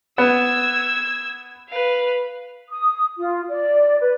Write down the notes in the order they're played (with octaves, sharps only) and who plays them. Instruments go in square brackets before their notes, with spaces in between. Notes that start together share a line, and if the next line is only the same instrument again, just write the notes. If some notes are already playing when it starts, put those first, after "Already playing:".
[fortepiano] B3 [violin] E6 G#6
[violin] B4 F5
[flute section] D#6
F4
D5
B4